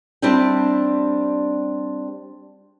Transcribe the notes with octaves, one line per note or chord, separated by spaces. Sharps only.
G3 C4 D4 E4 G4 G5